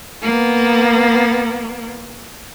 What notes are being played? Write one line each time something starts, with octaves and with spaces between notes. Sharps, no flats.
A#3 B3